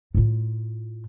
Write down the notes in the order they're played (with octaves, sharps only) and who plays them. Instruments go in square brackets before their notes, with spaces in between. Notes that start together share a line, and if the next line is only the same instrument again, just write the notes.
[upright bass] A2 F4